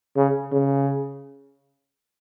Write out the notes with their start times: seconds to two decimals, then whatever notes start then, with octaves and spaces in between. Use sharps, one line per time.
0.16 C#3
0.52 C#3